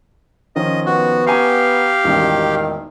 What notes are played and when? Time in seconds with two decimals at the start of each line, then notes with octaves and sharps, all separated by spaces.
0.56 D#3 F3 C#4 D#5
0.86 B3 F#4
1.26 G4 F5 G#5 A#5 C#6
2.04 E1 A1 D#3